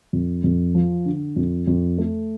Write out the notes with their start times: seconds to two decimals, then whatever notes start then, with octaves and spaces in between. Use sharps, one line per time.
0.13 F2
0.44 F2
0.75 F3
1.05 D3
1.36 F2
1.67 F2
1.98 A3